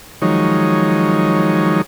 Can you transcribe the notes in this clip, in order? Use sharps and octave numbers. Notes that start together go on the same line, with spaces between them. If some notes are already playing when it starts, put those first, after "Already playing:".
D#3 F3 F#3 G#3 D#4 C#5